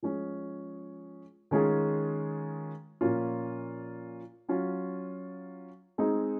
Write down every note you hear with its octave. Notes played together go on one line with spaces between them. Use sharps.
F3 G#3 C#4 G#4
D#3 G#3 C#4 F4 G#4
A#2 F3 A#3 C#4 F4
F#3 C#4 F4
G#3 C4 D#4 G#4